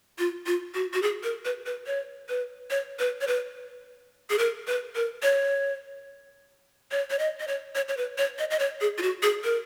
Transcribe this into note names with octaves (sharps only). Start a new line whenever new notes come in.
F4
F4
F#4
F#4
G#4
A#4
B4
B4
C#5
B4
C#5
B4
C#5
B4
G#4
A#4
B4
A#4
C#5
C#5
C#5
D#5
D#5
C#5
C#5
C#5
B4
C#5
D#5
D#5
C#5
G#4
F4
F#4
G#4
A#4